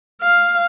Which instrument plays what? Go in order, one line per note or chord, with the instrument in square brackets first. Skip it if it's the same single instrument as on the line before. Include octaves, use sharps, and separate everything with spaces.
[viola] F5